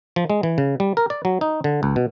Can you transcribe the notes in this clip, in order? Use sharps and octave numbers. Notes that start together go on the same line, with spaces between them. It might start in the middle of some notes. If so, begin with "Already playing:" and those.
F3
G#3
E3
C#3
G3
A#4
D5
F#3
D#4
D3
C#2
B2